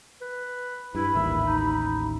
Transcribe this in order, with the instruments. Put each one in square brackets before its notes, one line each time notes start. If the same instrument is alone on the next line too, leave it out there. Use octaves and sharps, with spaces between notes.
[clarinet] B4
[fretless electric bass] G2 [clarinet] E4 [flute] B5
[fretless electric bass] A1 D#2 [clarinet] E5
[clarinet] D#4